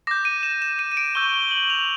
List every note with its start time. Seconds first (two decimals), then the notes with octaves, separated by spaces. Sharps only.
0.07 D6 G6 A#6
0.25 D#7
0.43 E7
0.62 E7
0.79 D#7
0.92 D#7
0.97 D7
1.15 C#6 E6 G6 G7
1.34 G7
1.51 F#7
1.70 F7